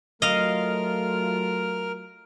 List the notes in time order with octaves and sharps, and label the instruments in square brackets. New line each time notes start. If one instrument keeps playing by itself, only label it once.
[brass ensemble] F#3 A3 F4 [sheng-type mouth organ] A#4 F6 [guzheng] D#5 F5